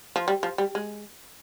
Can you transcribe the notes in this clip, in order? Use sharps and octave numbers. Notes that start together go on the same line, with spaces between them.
F3
G3
F3
G3
G#3